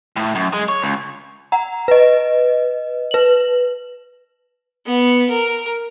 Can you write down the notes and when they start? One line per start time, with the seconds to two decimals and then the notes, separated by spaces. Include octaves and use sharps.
0.16 A2
0.35 F#2
0.53 G#3
0.68 C#5
0.82 C#2
1.52 F#5 A#5
1.88 B4 D#5
3.11 B4 F#7
4.86 B3
5.29 A#4